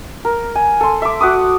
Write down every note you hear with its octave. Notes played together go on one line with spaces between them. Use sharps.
A#4
G#5
A4 C6
E5 D6
F#4 F#5 D6 D#6